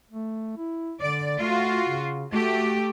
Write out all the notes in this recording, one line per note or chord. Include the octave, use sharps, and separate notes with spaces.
A3
E4
D3 D5
A3 F4 F#4
C#3
A3 F#4 G4